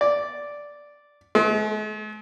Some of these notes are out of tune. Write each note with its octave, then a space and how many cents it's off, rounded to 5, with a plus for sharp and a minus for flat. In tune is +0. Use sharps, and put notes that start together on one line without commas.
D5 -5
G#3 +45